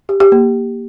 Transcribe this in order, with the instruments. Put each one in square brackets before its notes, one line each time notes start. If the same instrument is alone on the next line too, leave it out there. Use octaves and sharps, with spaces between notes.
[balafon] G4
G4
A#3